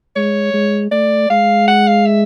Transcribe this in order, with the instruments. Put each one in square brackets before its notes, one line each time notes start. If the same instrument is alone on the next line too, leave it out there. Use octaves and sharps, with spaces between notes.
[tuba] G#3 [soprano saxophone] C#5
[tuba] G#3
[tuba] A3 [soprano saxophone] D5
[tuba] G#3 [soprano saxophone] F5
[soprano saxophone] F#5
F5
E5